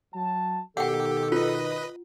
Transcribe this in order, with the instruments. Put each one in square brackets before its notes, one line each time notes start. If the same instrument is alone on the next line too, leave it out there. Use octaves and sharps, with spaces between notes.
[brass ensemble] F#3 A5
[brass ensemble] B2 D#3 [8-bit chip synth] G4 [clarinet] A4 [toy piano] F#5 G5
[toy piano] F4 [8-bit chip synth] B4 D#5